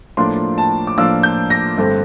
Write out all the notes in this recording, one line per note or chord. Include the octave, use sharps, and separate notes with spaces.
A2 F3 A#3 D4 F4 C6
A5
D6
A2 F3 A#3 D4 F4 E6
G6
A#6
G2 D3 A3 C4